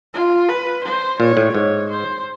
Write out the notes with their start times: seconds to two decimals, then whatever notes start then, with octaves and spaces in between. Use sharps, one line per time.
0.14 F4
0.49 B4
0.84 C5
1.20 A#2 C#5
1.37 A2
1.54 G#2 C#5
1.89 C5